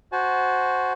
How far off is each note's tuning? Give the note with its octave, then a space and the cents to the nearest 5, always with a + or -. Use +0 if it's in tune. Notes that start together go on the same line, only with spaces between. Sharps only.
F#4 +0 C5 +0 A5 -45